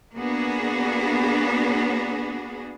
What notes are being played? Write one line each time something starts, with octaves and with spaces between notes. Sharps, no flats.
A#3 B3 D4 F#4 G#4